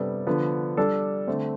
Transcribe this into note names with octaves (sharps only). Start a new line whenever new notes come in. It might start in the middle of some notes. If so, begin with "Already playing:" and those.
Already playing: C3 G3 B3 D4 A4
D3 F3 B3
G3 D4 A4
D3 A3 C4